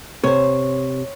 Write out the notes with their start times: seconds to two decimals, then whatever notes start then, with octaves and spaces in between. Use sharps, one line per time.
0.24 C3 C5 C#5